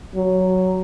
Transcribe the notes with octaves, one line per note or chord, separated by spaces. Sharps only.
F#3